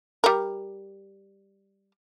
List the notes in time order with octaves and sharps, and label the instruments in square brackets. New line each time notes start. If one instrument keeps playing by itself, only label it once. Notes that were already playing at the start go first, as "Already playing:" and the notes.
[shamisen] G3 A#4